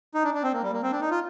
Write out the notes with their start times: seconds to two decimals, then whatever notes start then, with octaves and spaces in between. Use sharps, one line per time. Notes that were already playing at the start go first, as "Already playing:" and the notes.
0.15 D#4
0.24 D4
0.34 D4
0.44 C4
0.53 A#3
0.63 G3
0.73 A#3
0.83 C4
0.92 D4
1.01 D#4
1.11 F4